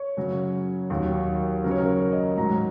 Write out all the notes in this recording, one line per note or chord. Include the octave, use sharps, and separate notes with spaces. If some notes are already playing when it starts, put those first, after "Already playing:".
Already playing: C#5
F#2 C#3 F#3
D#2 D#3 F#3
F#2 C#3 F#3 A#4
C#5
A#4
C#5
D#5
G#2 F#3 A#5